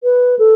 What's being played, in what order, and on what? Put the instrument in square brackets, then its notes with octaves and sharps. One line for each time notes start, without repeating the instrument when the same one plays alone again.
[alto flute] B4
A4